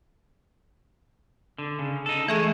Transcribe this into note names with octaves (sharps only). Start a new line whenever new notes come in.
D3
C#3
D#4 A4
E3 G#3 A3 G#4 E5